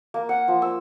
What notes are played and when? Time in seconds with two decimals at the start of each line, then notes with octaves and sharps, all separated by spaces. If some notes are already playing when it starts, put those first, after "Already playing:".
0.14 A#3
0.29 F#5
0.48 F3
0.62 E6